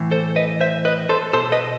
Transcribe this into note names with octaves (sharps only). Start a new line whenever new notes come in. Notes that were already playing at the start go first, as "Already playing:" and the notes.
Already playing: A2 E3
A4 C5
B4 D#5
C5 E5
B4 D#5
A4 C5
B2 A4 C5
B4 D#5